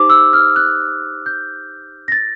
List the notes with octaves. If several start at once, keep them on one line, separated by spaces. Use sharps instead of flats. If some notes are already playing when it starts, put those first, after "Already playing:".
Already playing: D#4 G4 C5 D6
E6
F6
F#6
G6
A#6
A6